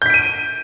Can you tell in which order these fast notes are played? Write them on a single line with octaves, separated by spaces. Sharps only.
G6 B6 D7 D#7